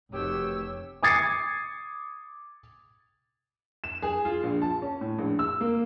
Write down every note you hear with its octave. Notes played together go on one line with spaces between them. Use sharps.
F1 B2 D#3 G4 C#5 E6
D6 D#6 G#6 A6 C7 C#7
E7
G#4
F4
A#1
A5
C#4
A2
A#1
E6
A#3